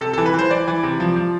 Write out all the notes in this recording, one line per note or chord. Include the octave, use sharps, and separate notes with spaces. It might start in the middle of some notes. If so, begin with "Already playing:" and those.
C3 A4
E3 A4
B4
E3 C5
E3 D5
E3
C3
F3
F3